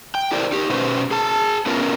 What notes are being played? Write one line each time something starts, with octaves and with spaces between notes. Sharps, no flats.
G5
E4 G4 A4 A#4 C5 D5
D#4 G4
B2 A3 C#4 B4 C5
G#4 A5
A3 B3 C#4 F4 A#4